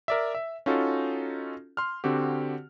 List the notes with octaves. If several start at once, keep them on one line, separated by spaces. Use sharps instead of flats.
A#4 D5 E5
E5
C#4 D#4 F4 F#4 A4
C6 F6
D3 C4 F#4 G4